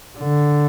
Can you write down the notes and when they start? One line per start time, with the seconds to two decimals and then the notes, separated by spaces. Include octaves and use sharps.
0.19 D3